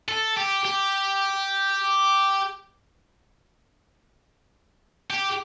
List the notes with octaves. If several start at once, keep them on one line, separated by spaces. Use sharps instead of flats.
A4
G4
G4
G4